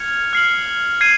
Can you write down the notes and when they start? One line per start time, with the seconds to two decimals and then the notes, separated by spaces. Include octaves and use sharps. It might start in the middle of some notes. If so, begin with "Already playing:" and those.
Already playing: F6 G#6 C#7 F7
0.33 F6 C7 F#7
1.01 G#6 C7 D#7